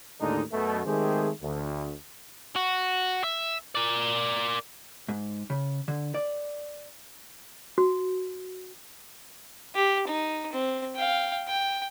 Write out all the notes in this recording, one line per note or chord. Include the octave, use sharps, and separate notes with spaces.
D#2 A2 D3 G#3 D4 D#4
F#2 B2 A3
D#3 G#3 A3 C4 G4 G#4
D2
F#4
E5
A#4 D5
G#2
C#3
D3
D5
F#4
G4
D#4
C4
F5 G5
G5